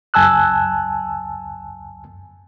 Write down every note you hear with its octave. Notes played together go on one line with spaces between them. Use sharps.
C#2 F#2 G#5 A5 E6 F#6